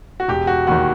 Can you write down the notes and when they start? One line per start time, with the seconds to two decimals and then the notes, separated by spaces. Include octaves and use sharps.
0.20 F#4
0.28 E1 G4
0.47 F#4
0.67 D#2 D#3 F#4